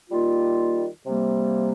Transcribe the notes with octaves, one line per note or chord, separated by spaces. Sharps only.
D#3 G3 A#3 F4
C3 G3 A#3